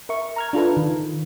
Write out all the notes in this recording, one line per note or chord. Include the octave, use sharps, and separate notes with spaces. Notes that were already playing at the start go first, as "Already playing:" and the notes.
A#4 E5 C#6
A#5 F6 G#6
D4 F4 A4 B4
D#3